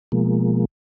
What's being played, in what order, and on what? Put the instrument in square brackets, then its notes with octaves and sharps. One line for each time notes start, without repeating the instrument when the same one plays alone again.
[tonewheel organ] B2 F3 G#3 A#3